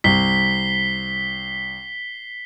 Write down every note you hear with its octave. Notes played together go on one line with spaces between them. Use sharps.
C2 B6 C7 G7